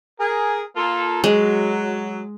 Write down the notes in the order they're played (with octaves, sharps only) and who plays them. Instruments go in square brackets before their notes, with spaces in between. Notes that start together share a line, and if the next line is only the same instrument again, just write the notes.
[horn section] G#4 A#4
A#3 F4 A4
[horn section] F#3 [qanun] G#3